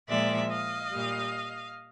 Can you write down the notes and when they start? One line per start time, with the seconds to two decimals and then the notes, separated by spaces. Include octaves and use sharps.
0.08 A#2 F3 G#3 D5 E5
0.49 D#5 F5
0.91 A#2 G3